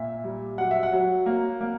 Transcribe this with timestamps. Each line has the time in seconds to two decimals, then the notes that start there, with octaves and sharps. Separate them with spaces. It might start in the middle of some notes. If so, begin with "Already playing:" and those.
Already playing: A#2 A#3 E5
0.24 G3
0.58 F#3 F#5
0.71 E5
0.83 F#5
0.93 F#3
1.26 A#3
1.61 A#3